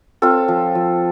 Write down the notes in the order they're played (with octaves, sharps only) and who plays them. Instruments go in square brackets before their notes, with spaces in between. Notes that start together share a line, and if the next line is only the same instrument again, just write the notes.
[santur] C4 F4 A4
F3
F3